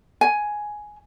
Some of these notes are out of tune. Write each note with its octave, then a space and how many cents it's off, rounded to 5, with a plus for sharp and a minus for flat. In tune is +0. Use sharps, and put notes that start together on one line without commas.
G#5 +5